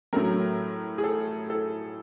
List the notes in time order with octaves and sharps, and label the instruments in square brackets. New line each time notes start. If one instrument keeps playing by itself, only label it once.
[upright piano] A2 F#3 A3 A#4
G#4
A4
A4